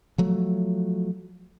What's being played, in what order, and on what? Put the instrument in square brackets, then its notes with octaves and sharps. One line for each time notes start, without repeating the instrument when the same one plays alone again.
[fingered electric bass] F3 F#3 A3